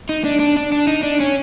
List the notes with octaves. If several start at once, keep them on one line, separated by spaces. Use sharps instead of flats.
D#4
D4
D4
D4
D4
D#4
D4
C#4